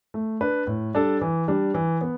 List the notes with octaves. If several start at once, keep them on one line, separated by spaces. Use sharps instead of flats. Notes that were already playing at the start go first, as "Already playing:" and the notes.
A3
D4 B4
A2
G3 D4 A4
E3
G3 D4
E3
B3